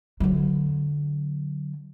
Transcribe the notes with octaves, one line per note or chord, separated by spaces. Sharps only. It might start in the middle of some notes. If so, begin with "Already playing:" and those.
D3 F#3